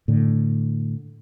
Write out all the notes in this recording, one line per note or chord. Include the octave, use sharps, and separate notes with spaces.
A2 D3